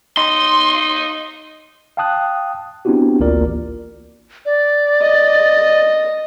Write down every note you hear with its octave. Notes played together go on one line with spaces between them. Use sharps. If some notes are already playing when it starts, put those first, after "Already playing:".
D#4 C6
F5 G5 A5 D#6 F#6
B3 C4 D4 E4 F#4 G4
A1 D2 A#3 F4 A#4 D5
D5
D#5